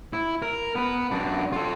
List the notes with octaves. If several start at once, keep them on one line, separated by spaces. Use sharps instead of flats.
E4
A#4
B3 B4
F#2 D4
F4 A4